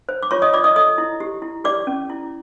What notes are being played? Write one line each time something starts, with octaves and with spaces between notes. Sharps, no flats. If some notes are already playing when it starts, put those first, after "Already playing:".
C5
D6
F4 C#5 C#6
D#5 D#6
F4 D5 D6
D#5 D#6
A4 D#5 D#6
E4
G4
E4
G4 D5 D6
C#4
E4